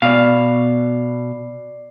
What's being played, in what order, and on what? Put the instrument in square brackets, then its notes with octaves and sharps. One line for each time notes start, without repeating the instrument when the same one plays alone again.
[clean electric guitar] B2 F5 [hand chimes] D5 C7